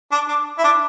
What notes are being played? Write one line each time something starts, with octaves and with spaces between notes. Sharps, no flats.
D4
D4
E4
D4